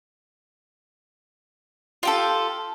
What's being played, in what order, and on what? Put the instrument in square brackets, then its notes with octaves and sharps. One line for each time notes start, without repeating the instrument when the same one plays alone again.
[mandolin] F4 G4 A4